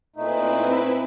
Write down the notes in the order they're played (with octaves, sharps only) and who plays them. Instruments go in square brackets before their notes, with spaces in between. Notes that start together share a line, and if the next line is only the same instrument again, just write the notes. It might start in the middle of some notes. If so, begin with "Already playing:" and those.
[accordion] A#2 A3 D#4 [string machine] C4 E4 B4